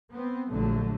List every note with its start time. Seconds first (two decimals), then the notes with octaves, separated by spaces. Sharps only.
0.11 B3 C4
0.49 A#1 D3 F#3 A3